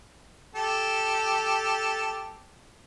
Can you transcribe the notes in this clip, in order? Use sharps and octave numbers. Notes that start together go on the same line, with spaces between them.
G4 A4